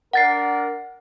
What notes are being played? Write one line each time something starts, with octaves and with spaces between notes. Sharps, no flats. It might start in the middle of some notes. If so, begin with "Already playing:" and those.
D4 A#4 F#5 A6 C7